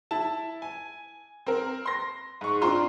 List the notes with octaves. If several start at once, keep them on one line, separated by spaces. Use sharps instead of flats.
E4 A5
G#5
C4 A#4
C6 A#6
G#2 C#6
C4 D4 F4 A#5 C6